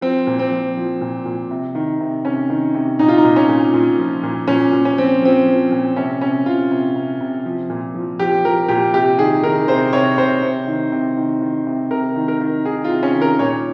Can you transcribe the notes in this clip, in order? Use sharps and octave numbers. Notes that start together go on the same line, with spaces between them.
F3 C4
A#2
C4
F3
F3
A#2
A#2
C3
D#3
C3
C3 C#4
D#3
C3
A#2 D#4
F4
D#4
A#2
C#4
A#2
A#2
F3
A#2
A#2 C#4
A#2
C#4
F3 C4
F3 C4
F3
A#2
C3 C#4
C3 C#4
C3 F4
C3
C3
C3
F3
A#2
F3
F3 G4
F3 A#4
A#2 G4
C3 G4
D#3 G#4
D#3 A#4
C3 C5
C3 C#5
C3 C5
C3
D#3
C3
D#3
D#3
C3
C3 A#4
D#3
A#4
D#3
D#3 G#4
F4
C3
C#4
D#3
A#4
A#2 C#5